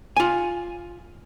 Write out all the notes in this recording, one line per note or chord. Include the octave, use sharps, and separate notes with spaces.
F4 G#5